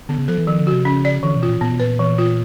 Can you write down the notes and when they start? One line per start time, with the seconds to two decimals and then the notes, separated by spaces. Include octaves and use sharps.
0.09 D3 B3
0.19 C#3
0.28 F3 A4
0.38 E3
0.47 D#3 F3
0.61 D3
0.67 F#4
0.73 C3
0.85 C#3 C#4
1.05 D5
1.23 D3 E3
1.36 B2
1.43 F4
1.49 A#2
1.61 A#2 B3
1.71 B2
1.80 A#2 B4
1.99 E3
2.18 F4